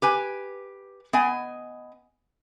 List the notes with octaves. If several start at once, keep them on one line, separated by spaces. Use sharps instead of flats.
G4 B4 G#5
B3 D#5 G#5